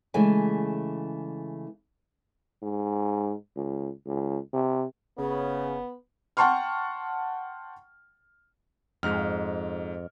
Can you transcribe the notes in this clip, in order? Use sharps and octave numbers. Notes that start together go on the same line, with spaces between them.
C#3 E3 G#3 A3 G#5
G#2
C#2
C#2
C3
F#1 C#3 B3
F#5 G5 A5 C6 C#6 F6
F2 G#2 F6